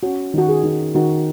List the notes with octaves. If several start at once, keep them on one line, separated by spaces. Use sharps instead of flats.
C#4 F#4
D#3 F#4
G#4
D#3
D#3 F#4